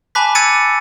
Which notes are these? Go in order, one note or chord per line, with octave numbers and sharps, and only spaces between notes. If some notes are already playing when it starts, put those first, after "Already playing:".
G#5 A5 B5 D6 F#6 B6
D6 E6 G#6 A6 C#7 D#7